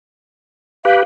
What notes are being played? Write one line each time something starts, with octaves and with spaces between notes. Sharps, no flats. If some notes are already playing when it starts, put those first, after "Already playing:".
G4 B4 F5